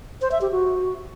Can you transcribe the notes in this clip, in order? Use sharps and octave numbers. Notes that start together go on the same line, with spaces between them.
C5
E5
G4
F#4